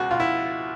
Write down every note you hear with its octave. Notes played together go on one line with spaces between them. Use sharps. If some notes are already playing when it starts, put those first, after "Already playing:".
Already playing: C#2 B2 F#4
B2 F4
E4